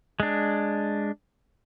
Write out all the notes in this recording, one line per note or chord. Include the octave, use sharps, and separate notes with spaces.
G#3 D4